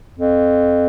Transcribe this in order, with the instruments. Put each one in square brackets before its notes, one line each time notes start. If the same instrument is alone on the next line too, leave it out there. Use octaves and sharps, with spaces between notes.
[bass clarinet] F2